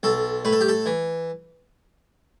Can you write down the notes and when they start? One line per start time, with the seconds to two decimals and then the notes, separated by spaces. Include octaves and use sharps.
0.03 B1 A4
0.45 A2 B4
0.53 A4
0.61 G4
0.68 A4
0.86 E3